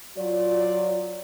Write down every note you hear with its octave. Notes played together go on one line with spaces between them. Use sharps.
F#3 F4 D5